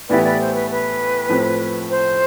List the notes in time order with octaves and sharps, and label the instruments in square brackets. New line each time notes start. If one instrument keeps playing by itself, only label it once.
[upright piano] A2 E3 B3 E4 G4 [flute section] B4 D5
[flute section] B4 D5
C5
B4
B4
[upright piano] A2 F3 C4
[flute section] C5